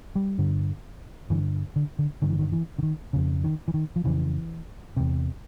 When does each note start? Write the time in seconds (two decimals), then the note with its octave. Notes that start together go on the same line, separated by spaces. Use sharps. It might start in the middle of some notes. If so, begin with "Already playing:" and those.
0.15 G3
0.38 G2 D3
1.30 G2 D3 E3
1.76 D3
1.99 D3
2.22 G2 D3 D#3
2.30 E3
2.39 D#3
2.52 E3
2.78 D3
2.83 D#3
3.13 F2 C#3
3.44 D#3
3.68 E3
3.74 D#3
3.96 F3
4.04 F2 C#3 E3
4.97 E2 C3